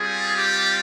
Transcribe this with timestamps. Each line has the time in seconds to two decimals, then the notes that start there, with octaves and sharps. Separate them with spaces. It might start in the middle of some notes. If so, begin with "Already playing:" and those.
Already playing: G3 C4 F4 G#4
0.37 G4